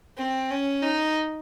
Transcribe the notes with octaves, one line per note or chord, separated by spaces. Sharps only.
C4
C#4
D#4